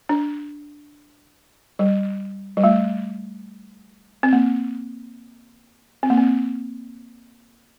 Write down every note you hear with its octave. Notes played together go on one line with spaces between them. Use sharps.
D4
G3
G3
A3
C4
A#3
C4
A#3
C4